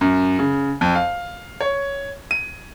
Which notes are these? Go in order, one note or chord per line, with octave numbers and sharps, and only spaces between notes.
F#2
C#3
F2
F5
C#5
D#7